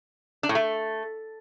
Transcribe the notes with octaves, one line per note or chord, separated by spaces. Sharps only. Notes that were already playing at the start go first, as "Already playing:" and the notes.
D4
A2
A3